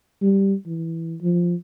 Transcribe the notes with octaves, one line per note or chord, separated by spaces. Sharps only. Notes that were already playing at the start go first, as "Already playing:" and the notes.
G3
E3
F3